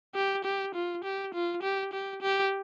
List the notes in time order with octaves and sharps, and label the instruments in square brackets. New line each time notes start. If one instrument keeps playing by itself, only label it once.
[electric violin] G4
G4
F4
G4
F4
G4
G4
G4